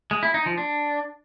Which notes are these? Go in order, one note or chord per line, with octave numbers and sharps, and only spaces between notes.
G#3
E4
D#4
F3
D4